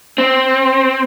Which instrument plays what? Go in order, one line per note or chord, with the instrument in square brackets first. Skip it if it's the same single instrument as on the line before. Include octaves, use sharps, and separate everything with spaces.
[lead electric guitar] C4